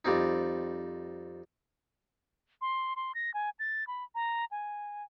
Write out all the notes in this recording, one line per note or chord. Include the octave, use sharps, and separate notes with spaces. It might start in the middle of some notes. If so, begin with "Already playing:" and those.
F2 G3 C4 D#4
C6
C6
A#6
G#5
A6
B5
A#5
G#5